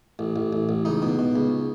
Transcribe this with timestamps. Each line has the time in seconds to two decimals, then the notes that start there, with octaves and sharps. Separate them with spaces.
0.19 A1
0.36 A1
0.53 A1
0.69 A1
0.85 C#2 D#4
1.02 B2
1.19 B2
1.36 C#2